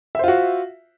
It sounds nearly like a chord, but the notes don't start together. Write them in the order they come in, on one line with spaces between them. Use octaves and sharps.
E5 C5 F4 F#4